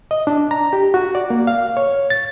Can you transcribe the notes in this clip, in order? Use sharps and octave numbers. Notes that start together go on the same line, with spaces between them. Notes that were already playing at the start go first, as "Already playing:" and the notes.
D#5
D4
A#5
G4
F#4
D5
A#3
F5
C#5
A6